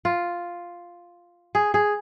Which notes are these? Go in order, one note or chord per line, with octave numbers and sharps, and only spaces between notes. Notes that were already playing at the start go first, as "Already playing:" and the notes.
F4
G#4
G#4